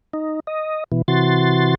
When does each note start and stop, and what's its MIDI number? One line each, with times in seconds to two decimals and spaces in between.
0.13 0.40 63
0.47 0.84 75
0.92 1.02 47
0.92 1.02 52
1.08 1.75 48
1.08 1.75 52
1.08 1.75 66
1.08 1.75 84
1.08 1.75 93